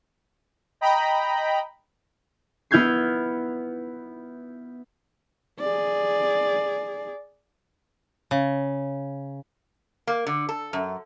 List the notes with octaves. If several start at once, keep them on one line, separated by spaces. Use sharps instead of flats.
D#5 G5 A#5 B5
B3 E4 F6 G6 G#6 C7
G#4 D5
C#3
A#3
D3
A4
F#2